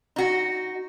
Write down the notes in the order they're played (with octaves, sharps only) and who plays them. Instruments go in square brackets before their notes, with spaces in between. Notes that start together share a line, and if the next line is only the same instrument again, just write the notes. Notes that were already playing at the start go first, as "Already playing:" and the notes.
[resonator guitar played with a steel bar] D#4 F#4